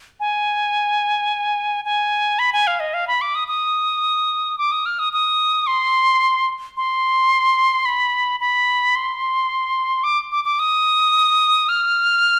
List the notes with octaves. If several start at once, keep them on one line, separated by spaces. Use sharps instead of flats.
G#5
G#5
B5
G#5
F5
D#5
F5
B5
D6
D#6
D#6
D6
D#6
F6
D#6
D#6
C6
C6
B5
B5
C6
D6
D6
D6
D#6
F6